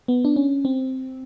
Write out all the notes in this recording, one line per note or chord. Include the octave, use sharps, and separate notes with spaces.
B3
D4
C#4
C4